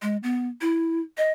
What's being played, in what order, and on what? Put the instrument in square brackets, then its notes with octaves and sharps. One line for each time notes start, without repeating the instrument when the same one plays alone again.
[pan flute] G#3
B3
E4
D#5